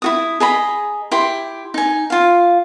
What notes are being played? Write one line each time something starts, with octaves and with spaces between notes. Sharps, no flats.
E4 F#4 D#6
G#4 D#5 A#5 B5
E4 G4 G5 C6
D#4 G#5
F4 F5